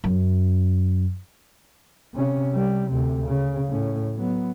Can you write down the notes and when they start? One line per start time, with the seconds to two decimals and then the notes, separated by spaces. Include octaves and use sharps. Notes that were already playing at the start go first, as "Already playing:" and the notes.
0.04 F#2
2.14 C3 C#4
2.53 C3 G3
2.91 D2 C3
3.27 C#3
3.69 A2 C#4
4.16 F#3 B3